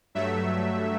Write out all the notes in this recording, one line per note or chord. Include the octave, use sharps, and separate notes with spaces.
G2 F#3 A3 E5